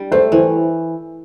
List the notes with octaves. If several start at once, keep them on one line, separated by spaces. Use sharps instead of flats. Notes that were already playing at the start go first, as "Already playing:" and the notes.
Already playing: G3 D4
A3 C5
E3 C5